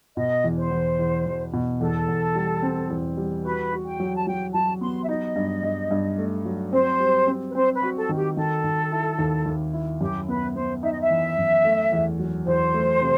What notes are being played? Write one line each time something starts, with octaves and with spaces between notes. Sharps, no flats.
B2 D#5
E2
C5
E2
E2
E2
B2
E2 A4
E2
G3
C4
E2
G3
F#4 B4
F#4
G5
F#3
A5
F#3 G5
F#3 A5
B3 C6
E5
D#4 D#5
G2
G2
G2
A3
F#3
C4 C5
G3
C4
B4
C4 C5
B4
F#4
A4
D#3
G4
D#3 A4
D#3
E4
D#2
D#2
E4
F#2 G4
B3 B4
B3 C5
D#4 E5
D#5
E5
E3
F#2
A3
E2
F#3
E2 C5
A3
C3